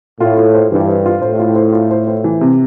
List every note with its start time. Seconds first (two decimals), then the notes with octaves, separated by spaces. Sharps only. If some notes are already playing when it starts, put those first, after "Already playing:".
0.20 A2 F4
0.37 F4
0.54 C5
0.71 G2 E3
0.89 C5
1.06 F4
1.22 A2 C5
1.39 F4
1.56 C5
1.72 F4
1.91 C5
2.07 C5
2.24 E3
2.41 C3